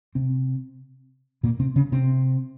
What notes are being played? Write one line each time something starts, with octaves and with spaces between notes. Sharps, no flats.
C3 C4
A#2 A#3
C3 C4
C#3 C#4
C3 C4